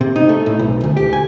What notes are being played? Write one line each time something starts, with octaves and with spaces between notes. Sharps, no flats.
C3
D#4
A3
A2
B1
D2
G4
G#5